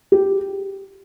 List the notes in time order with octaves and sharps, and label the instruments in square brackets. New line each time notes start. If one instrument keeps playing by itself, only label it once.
[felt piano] G4